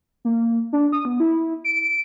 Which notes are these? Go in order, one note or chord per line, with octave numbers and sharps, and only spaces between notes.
A#3
D4
D#6
B3
E4
D7